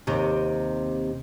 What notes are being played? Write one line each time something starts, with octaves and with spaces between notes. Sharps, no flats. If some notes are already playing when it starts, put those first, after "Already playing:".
D#2 C3